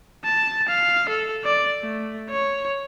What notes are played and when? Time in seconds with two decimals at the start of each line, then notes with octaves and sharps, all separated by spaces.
0.25 A5
0.69 F5
1.09 A4
1.45 D5
1.81 A3
2.30 C#5